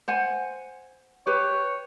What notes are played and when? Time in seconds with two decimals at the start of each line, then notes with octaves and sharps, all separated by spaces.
0.08 C5 F#5 G#5
1.26 G4 B4 C#5